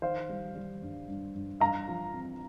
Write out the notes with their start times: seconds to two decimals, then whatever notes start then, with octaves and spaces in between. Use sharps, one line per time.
0.02 D#3 C5 F5
0.29 G3
0.55 G3
0.82 G2
1.08 G2
1.35 G2
1.60 G2 F5 A#5
1.88 F3
2.14 C4